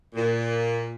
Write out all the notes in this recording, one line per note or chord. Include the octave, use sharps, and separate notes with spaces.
A#2